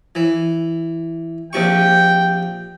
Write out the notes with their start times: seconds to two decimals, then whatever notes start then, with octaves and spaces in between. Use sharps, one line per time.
0.15 E3
1.53 A#1 C3 G5 C#6